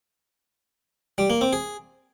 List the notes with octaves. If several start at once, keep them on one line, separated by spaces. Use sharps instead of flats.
G3
A#3
C4
G#4